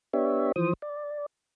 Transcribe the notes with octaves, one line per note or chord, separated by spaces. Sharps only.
B3 D4 G4 C#5 E5
E3 F3 C5 D#6
D5